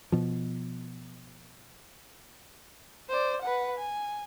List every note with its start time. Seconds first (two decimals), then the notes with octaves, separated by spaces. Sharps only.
0.12 B2 F3
3.09 C5 D5
3.42 B4 F#5
3.78 G#5